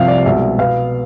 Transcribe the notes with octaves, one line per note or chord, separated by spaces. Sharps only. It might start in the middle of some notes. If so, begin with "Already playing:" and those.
Already playing: C2 C3 F3 F5
D5
C2 B2 G#3 E5
B2 B3 F5